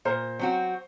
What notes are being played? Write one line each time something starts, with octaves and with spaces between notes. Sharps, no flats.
A#2 C5
F#3 C4 F#4